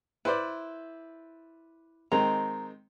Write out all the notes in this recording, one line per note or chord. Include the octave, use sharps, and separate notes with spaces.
E4 B4 C5 D5
D#3 G#3 C4 A#5